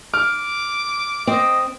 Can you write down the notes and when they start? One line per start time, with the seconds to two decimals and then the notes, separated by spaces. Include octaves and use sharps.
0.14 D6 F6
1.27 C4 D#5